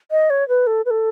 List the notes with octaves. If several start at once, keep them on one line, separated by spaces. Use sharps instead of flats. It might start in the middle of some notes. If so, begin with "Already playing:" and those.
D#5
C#5
B4
A4
B4
A4